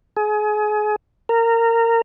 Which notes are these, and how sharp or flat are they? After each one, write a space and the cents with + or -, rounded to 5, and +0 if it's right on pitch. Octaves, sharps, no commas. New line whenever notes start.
G#4 +30
A#4 -20